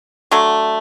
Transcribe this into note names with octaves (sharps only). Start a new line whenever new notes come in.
D3 F#3 A3